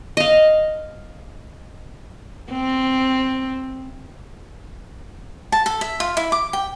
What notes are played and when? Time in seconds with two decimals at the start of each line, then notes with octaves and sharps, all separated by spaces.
0.17 D#5 F5
2.52 C4
5.52 A5
5.66 A4
5.81 E5
6.00 F4
6.17 E4
6.32 D6
6.53 G5